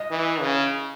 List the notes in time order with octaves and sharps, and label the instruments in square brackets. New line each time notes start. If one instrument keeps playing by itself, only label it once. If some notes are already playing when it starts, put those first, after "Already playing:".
Already playing: [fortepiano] D#5
[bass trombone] E3
C#3